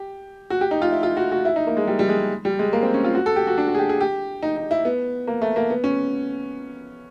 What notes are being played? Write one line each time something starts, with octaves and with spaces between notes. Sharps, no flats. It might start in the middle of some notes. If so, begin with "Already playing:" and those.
Already playing: G4
F#4
G4
D#4
F4
E4
F4
F#4
F#4
E4
D#4
A#3
G#3
G3
G3
G#3
G3
G#3
A#3
C4
C#4
F4
F#4
A4
G4
F#4
D4
F#4
G#4
G4
G#4
G4
D#4
D#4
E4
B3
A#3
A3
A#3
B3
C#4